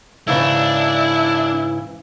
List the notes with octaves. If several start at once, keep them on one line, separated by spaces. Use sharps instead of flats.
G#2 C#3 E3 D4 E4